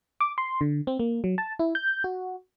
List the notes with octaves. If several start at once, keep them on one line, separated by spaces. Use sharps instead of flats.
D6
C6
D3
C4
A#3
F#3
A5
E4
G6
F#4